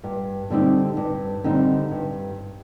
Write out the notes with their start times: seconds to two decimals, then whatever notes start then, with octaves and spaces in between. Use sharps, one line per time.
0.04 G2
0.50 D3 G3 C4 D#4
0.97 G2
1.44 D3 G3 C4 D#4
1.91 G2